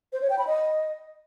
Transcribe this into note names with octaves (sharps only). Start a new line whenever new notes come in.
C5
C#5
G5
B5
D#5